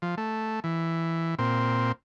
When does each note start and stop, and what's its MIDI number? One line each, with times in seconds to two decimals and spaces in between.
0.02 0.15 53
0.18 0.60 57
0.64 1.35 52
1.38 1.92 46
1.38 1.92 60